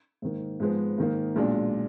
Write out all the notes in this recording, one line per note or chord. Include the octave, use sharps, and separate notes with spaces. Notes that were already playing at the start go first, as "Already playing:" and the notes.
G#2 D#3 A#3
G#2 F3 G#3 B3
G#2 D#3 A#3
B1 A#2 G#3 D4